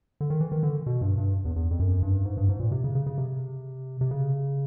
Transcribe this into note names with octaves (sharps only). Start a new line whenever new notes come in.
D3
D#3
E3
D#3
D3
B2
G2
G2
E2
E2
F2
F#2
G2
G#2
G2
G#2
A#2
C3
C#3
C#3
C#3
C3
C3
C#3